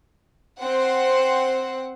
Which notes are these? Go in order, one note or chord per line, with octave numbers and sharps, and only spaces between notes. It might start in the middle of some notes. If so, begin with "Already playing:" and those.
C4 C5 F#5